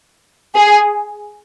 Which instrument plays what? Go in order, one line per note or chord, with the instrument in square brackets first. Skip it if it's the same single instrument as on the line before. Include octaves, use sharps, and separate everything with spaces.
[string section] G#4